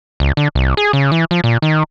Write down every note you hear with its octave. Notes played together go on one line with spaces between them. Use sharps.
C#2
D3
C2
G#4
C#3
E3
F3
A#2
D#3